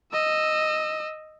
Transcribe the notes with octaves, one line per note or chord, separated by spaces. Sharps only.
D#5 E6